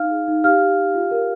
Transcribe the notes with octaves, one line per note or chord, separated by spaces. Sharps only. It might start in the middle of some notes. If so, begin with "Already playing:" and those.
Already playing: D#4 F5 F6
G#4
D#4
G4 F5 F6
G4
G4
F4
A#4